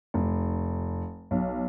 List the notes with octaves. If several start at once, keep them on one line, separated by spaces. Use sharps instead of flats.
F1
B1